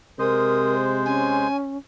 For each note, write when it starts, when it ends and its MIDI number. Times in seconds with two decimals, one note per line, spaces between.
0.19 1.47 48
0.19 1.48 56
0.19 0.75 70
0.19 1.48 72
0.19 0.85 87
1.05 1.78 61
1.05 1.57 80